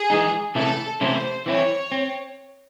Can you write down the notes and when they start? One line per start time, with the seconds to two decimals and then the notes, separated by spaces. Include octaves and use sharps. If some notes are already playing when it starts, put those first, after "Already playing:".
Already playing: G#4
0.10 E3 G#3 D#4
0.55 C3 E3 A3 C#4 E4 A4
1.01 C3 E3 A3 C#4 E4 C5
1.46 E3 C4 E4 C#5
1.92 C4